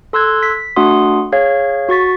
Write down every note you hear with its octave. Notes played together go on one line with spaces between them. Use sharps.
A4 C6 E6 F#6 G#6
B6
A3 D4 F#4 F#5 C6 D#6
G#4 C#5 F5 G#6
F#4 C#6 A6 B6